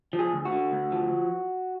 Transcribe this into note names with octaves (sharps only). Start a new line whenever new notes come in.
F3
G#4
D2
F#4
D3
D2
F3